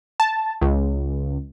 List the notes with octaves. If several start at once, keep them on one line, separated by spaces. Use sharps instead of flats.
A5
C#2